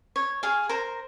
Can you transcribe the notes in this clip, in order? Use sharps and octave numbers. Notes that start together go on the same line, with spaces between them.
C#5
G#4 F5
A#4 C5 A#5